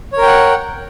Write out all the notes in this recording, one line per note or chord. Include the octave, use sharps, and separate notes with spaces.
A#4 C#5 F#5 G5